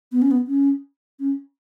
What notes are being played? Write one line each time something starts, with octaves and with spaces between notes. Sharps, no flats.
B3
C#4
B3
C#4
C#4